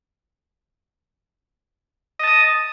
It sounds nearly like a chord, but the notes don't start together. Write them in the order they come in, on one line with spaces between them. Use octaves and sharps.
D#5 A5 D#6